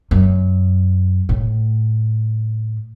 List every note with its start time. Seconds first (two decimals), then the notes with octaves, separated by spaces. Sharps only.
0.11 F#2
1.29 A2